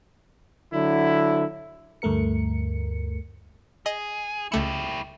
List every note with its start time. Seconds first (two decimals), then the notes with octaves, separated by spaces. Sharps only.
0.74 D3 F#3 E4
2.02 D2 G2 A3 A#4 C#7
3.86 G#4 D#5
4.52 C#2 A3 E4 G4 C#7